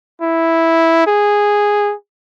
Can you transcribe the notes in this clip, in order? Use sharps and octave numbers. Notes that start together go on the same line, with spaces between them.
E4
G#4